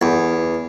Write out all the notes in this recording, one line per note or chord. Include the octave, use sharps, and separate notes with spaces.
E2